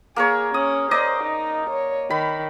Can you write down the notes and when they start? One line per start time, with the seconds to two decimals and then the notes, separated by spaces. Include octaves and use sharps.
0.16 A#3 G#4 A#4 C#5
0.54 C#4 D#6
0.91 C5 D5 D#5 A#5
1.24 D#4
1.70 C#5
2.10 D#3 B5